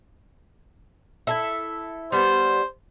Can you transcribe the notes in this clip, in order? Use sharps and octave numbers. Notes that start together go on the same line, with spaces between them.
E4 A4 E5
G3 B3 C5